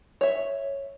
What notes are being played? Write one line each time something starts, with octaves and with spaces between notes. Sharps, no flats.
C#5 E5